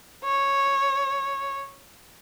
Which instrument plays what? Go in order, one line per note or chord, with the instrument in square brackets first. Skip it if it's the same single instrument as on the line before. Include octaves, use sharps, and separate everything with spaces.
[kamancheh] C#5